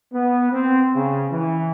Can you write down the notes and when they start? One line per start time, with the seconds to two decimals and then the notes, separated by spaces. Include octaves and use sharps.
0.13 B3
0.52 C4
0.95 C#3
1.31 E3